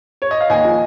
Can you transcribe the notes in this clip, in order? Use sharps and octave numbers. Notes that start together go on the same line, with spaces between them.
C#5
D#5
F5
D#2 D#5 G#5
F3